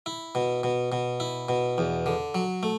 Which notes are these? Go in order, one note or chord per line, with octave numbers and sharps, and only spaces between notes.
E4
B2
B2
B2
E4
B2
E2
D3
F#3
A3